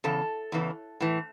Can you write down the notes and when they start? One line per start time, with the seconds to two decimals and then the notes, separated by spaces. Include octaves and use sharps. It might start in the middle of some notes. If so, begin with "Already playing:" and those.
0.04 E2 C#3 A4
0.52 E2 C#3 E3
1.00 A2 E3